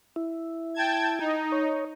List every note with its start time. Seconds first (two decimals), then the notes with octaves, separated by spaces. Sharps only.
0.16 E4
0.74 G5 A5 G#6
1.20 D#4
1.52 C#5